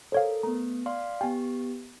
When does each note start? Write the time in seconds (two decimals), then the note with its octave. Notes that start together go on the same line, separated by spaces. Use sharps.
0.12 A4 A#4 C5 C#5 F5
0.43 A3 B3 A#5
0.86 D5 F5 C6
1.21 B3 G4 G5 G#5